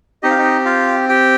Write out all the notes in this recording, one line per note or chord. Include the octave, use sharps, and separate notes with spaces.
C4 D#4 G4 D#5
F5
D#4 D#5
F4 F5
G4 G5